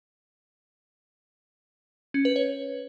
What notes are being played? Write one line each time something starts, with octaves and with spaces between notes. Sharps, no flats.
C#4
B4
C#5